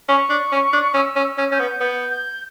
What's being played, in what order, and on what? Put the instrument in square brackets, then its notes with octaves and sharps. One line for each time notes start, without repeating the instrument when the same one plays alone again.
[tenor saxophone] C#4 [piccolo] C#6
[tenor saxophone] D4
C#4
D4
[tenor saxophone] C#4 [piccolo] E6
[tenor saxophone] C#4
[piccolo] E6
[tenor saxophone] C#4
[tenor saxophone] C#4 [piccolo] G6
[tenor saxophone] B3
[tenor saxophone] B3 [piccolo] G6
[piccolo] G6